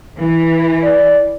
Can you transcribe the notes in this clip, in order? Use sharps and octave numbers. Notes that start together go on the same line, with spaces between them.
E3
D5